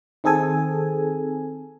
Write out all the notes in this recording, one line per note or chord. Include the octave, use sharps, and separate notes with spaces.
D#3 C4 G#4 A4 G#5